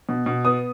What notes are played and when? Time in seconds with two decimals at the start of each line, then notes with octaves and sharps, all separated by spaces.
0.09 B2
0.26 B2
0.45 B3 D#6